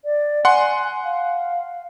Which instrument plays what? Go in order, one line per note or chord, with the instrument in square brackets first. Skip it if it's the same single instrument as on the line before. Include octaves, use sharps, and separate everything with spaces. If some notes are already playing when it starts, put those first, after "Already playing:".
[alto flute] D5
[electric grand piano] F#5 C6 [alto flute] G#5
[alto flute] F5